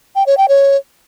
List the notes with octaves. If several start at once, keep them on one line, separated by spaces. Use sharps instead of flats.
G5
C#5
G5
C#5